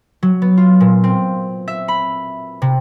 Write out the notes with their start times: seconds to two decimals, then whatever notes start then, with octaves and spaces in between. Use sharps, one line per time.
0.23 F#3
0.42 B3
0.57 F4
0.80 A#2
1.04 C4
1.68 E5
1.88 B5
2.62 C3